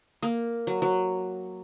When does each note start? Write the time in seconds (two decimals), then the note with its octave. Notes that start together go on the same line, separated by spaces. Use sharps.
0.22 A#3
0.67 F#3
0.82 F#3